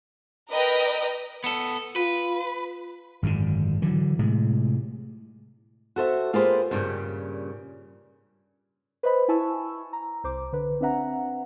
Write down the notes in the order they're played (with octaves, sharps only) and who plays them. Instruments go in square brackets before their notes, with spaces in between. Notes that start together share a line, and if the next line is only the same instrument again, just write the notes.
[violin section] A#4 B4 D#5 G5
[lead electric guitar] B3 A4
[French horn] F4 [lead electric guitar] B4
[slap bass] G#1 F#2 B2 D3
D3 E3 F#3
A2 C3 G#3
[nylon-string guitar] F#4 A4 C5 E5
A#3 F4 G4 G#4 B4 C5
G2 A#2 C#3 G3
[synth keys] B4 C5 D#5 B5
E4 G#5 A5 B5 C#6 E6
A#5
C2 C5 D6
D3 B4
C4 D4 B4 E5 F#5 A#5